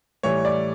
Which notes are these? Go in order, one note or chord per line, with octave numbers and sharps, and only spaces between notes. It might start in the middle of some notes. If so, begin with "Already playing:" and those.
A2 E3 G3 C#5
D5